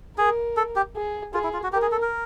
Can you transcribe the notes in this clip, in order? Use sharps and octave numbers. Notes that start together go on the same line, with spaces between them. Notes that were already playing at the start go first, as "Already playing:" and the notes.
G#4 A#4
A4
G4
G#4
F4 G#4
E4
F4
F#4
G4 A#4
G#4
A4
A#4